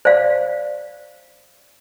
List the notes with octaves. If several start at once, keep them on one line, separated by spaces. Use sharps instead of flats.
C5 D5 F5